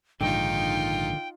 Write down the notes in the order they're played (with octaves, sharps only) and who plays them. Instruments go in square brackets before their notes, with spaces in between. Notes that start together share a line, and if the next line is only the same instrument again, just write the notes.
[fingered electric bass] A#1 G#2 [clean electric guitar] D3 D#3 [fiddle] D#4 F4 [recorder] G5